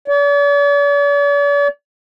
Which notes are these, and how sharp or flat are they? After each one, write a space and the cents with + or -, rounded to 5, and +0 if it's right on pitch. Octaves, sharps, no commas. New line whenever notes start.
D5 -45